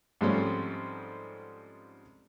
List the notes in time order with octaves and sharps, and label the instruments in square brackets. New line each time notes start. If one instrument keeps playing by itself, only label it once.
[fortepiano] G#2 F3 G3 A3 C4 C#4